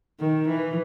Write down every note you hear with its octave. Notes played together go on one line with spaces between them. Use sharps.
D#3
E3